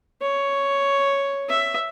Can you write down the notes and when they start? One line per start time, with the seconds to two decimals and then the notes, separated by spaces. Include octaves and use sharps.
0.21 C#5
1.49 E5